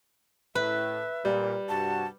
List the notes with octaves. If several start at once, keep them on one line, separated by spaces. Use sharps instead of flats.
A2 B4 E5
A#2 G3
G2 C3 F#4 A5